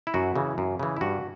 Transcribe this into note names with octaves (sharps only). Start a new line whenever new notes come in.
E4
F#2 F#4
C#3 E3
F#2
C#3 E3
E4
G2 F#4